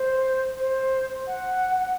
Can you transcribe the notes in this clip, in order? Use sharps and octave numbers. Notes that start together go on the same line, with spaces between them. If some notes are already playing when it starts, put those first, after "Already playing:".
Already playing: C5
C5
F#5